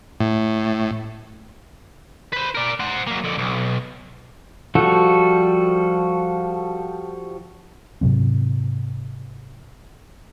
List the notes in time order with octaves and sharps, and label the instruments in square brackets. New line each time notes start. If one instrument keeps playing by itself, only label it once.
[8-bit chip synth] A2
[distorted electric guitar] B4 C5
A#4 D5
C5 F#5
F#3 A#3
F2 D3
B1
[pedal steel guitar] F3 G3 F#4 A4
[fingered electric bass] G#2 C3 F#3 C4